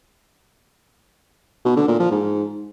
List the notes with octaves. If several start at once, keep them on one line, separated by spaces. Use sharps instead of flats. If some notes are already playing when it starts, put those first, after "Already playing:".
B2
D3
A#2
F3
G#2